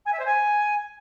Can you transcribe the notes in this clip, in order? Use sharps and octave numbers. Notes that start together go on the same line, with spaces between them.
G#5
E5
C5
G#5